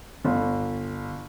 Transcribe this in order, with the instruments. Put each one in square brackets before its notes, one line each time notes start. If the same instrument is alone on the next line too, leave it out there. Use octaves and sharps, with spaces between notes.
[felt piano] G1